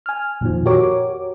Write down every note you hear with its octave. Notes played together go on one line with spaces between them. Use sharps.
G#5 F6
F2 A#2 D#3 F3
F#4 G4 A#4 C#5 D6